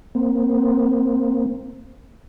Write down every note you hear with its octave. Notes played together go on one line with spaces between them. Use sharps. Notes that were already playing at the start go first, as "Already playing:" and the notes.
A#3 C4